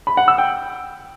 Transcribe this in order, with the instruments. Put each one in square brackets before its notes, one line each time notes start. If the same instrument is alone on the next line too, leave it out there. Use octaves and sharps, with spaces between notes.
[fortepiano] B5
F#5
E6
G5